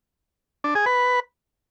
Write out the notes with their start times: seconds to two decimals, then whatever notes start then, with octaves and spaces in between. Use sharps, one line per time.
0.64 D4
0.75 G#4
0.86 B4